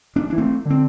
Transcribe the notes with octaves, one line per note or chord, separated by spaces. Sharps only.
B3 D4
E3 D4
A3 C4
D3 C4